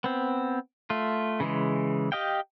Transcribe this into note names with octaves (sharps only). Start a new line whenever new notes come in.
B3 C4
A3 F4
C#3 E3 G#3
G4 D#5 F5 G5